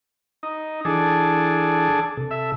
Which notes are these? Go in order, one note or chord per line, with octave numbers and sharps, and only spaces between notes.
D#4
E3 D4 G#4 A4
C3 A4
E5